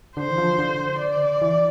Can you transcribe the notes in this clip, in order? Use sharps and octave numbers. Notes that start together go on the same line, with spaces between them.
D3 C5
E3
F3
D3
D5
E3